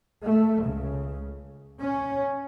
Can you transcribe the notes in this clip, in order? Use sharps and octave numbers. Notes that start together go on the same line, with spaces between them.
A3
C#2 C#3
C#4